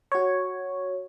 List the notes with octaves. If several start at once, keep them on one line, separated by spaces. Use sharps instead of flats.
F#4 C#5